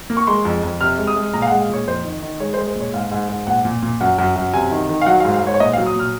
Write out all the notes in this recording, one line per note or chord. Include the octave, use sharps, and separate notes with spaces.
A#3
C#6
G#3 C6
F2
F2
C3 F6
G#3
D#6
G#3
A#2 A#5
F5
F#5
G#3
F5
A#2 C#5
F2 C5
D#3
D#3
G#3 C#5
C5
G#3
C5
A#2 C#5
G#2 F5
G#2
G#2
A#2 F#5
A#2
A#2
F#2 F#5
F#2
F#2
C3 G#5
D#3
D#3
F5
F#3 F#5
F5
G#2
F5
G#2 C#5
C#5
A#2 D#5
F5
F#3
D#6
A#2 F6